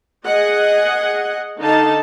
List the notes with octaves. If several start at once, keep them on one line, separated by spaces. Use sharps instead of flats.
G#4 D#5 F#5
D3 D#4 A4 F5 A5